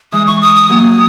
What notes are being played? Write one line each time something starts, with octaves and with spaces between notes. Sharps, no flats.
E3 G#3 D#6
C#6
D#6
D#6
F#3 A#3